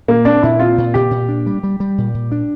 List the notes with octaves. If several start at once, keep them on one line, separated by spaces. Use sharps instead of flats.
A#2 A#3
C4 D4
A#2 E4
C4 F4
A#2
A#2 G4
A#2
D4
G3
G3
G3
A#2
A#2
D4